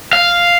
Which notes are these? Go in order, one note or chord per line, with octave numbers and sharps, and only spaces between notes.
F5